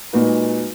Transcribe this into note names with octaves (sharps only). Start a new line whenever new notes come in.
A#2 G#3 D#4 F#4 B4